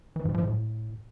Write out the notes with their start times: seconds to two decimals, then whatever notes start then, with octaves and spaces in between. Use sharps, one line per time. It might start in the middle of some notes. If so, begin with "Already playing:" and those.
0.16 E3
0.25 G#2
0.34 F3
0.44 A2